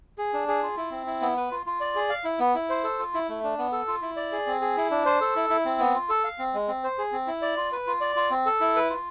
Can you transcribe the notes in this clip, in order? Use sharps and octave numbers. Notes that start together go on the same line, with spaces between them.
G#4
D4
G#4
F4
E4
C4
E4
B3
B4
F4
F4
D5
G#4
F5
E4
B3
E4
C5
A4
F4
E4
A3
D4
B3
A4
F4
E4
D5
G#4
C4
G#4
E4
D4
C5
A4
E4
E4
C4
B3
F4
A4
F5
C4
G#3
C4
C5
G#4
C4
E4
D5
F4
B4
F4
D5
F4
C4
A4
E4
B4
F4